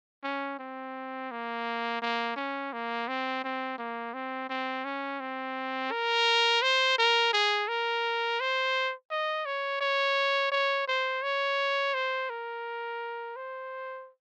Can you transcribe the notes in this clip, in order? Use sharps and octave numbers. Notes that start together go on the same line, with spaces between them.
C#4
C4
A#3
A#3
C#4
A#3
C4
C4
A#3
C4
C4
C#4
C4
A#4
C5
A#4
G#4
A#4
C5
D#5
C#5
C#5
C#5
C5
C#5
C5
A#4
C5